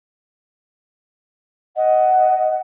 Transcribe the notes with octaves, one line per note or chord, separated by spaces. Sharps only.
D#5 F#5